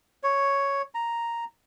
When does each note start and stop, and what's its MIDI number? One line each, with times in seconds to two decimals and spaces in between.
0.23 0.82 73
0.95 1.45 82